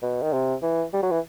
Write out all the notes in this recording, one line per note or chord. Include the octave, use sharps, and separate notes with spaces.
B2
D#3
C3
E3
G3
F#3
E3